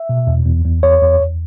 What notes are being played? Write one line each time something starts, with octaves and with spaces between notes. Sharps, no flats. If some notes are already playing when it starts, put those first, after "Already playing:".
Already playing: E5
B2
E2
E2
E2
E2 C#5
E2
E2